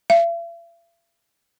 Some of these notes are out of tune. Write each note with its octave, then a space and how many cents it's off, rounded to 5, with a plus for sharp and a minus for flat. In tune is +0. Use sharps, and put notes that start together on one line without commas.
E5 +45